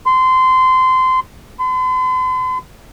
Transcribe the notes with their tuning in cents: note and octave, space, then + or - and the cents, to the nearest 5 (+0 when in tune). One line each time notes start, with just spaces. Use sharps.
C6 -20
C6 -45